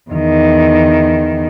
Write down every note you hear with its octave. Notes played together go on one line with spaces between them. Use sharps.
E2 D#3